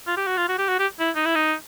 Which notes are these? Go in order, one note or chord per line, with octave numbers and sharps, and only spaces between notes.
F4
G4
F#4
F4
F#4
G4
F#4
G4
E4
D#4
E4
D#4